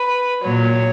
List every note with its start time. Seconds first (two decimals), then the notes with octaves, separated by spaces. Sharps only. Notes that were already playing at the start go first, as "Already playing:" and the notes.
Already playing: B4
0.43 A#2 F#3 C#5